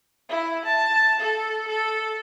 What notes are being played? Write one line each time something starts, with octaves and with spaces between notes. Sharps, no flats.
E4
A5
A4
A4